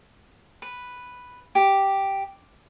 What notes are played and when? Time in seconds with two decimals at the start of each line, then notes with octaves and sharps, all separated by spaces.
0.62 B4
1.55 G4